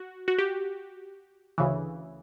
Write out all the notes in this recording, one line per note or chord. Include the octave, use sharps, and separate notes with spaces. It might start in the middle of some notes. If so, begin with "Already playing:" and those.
Already playing: F#4
F#4
G4
D2 C#3 E3